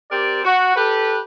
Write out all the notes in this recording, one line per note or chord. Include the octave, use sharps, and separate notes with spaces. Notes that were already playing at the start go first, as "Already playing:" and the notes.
C4 G4 A#4 D5
F#4
G4 A4 B4